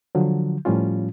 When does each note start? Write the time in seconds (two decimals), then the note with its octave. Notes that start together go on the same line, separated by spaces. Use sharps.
0.15 D3 F3 F#3
0.65 A2 F3 G3 C#4 F4